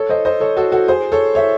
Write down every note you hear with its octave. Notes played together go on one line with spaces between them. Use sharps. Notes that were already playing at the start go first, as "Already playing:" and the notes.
Already playing: A4 C#5
C5 D#5
C5 D#5
A4 C#5
F#4 A4
F#4 A4
G#4 C5
A4 C#5
C#5 E5